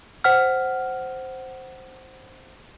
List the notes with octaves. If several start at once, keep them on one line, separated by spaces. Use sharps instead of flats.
C5 F#5 F6